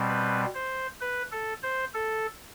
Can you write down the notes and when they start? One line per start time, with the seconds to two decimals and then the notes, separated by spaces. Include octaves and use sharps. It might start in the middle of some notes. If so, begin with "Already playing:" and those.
Already playing: B2 G3 C4
0.08 B4
0.55 C5
1.01 B4
1.32 A4
1.63 C5
1.94 A4